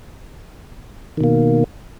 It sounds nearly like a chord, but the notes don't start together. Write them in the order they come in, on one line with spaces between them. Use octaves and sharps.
D#3 B2 A#3